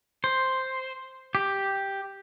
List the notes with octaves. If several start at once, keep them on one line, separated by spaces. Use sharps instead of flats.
C5
G4